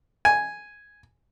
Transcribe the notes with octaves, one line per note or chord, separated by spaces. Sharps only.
G#5